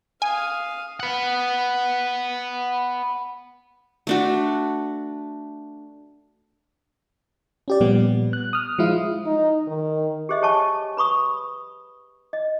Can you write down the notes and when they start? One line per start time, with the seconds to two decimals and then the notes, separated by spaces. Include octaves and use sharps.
0.22 F5 G#5 D#6
1.00 B4 F#5
4.07 A3 D4 F#4
7.68 C#4 G4 D5
7.80 A#2 F3 G3 B3
8.33 F#6
8.53 D#6 F6
8.79 F3 G#3 E4 F4
9.26 D#4
9.67 D#3
10.29 G4 G#4 C5 D#5 E5
10.42 G4 C#5 G#5 A5 C#6
10.97 B4 B5 C#6 D#6
12.33 D#5